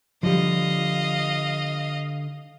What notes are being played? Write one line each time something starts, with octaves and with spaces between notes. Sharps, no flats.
D3 F3 G3 D#5 F5